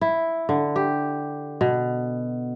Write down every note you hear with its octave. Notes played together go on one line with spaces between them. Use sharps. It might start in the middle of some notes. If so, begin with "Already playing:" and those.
E4
D3
G4
B2